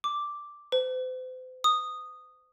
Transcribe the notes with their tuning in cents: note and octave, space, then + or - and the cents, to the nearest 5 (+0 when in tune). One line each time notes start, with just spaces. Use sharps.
D6 +0
C5 -40
D#6 -10